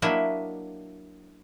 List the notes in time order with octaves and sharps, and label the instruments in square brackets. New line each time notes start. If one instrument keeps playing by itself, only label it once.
[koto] F#3 A#3 D4 E4 D#5 E5